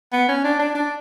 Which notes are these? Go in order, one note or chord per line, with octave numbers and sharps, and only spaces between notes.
B3
C#4
D4
D4
D4